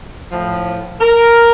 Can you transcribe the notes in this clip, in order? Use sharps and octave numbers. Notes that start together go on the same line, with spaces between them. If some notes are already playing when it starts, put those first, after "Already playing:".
A2 F3
A#4